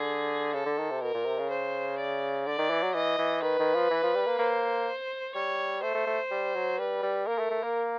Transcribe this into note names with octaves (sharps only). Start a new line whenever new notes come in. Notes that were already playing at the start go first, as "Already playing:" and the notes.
Already playing: D3 G#4
C#3 A4
D3
D#3
C3
B2 A#4
A#2
C3
C#3
C5
D5
D3 D5
D#3
E3
F#3
E3 D#5
E3
D#3 B4
D#3
F3
E3
F3
G3
A#3
A#3 C5
G3 C#5
A3 C5
A3
A3
G3
F#3
G3 B4
G3
A#3 A#4
A3
A3
A#3